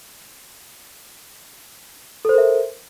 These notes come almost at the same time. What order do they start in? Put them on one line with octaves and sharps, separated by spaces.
A4 C5 A#4 E5